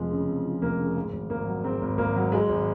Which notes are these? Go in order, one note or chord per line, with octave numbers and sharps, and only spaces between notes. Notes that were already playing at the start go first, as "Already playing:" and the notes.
Already playing: F1 F2 F3 G#3
C#3
F2
F3
F1 A#3
C#3
G#2
G#1
G#1 A#3
F#3
G#2 C4
G#1
G#1 A#3
F#3
G#2 G#3
G#1